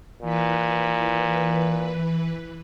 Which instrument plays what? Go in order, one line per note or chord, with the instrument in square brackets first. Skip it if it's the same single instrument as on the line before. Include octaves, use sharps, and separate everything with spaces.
[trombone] A#2 [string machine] E3 B4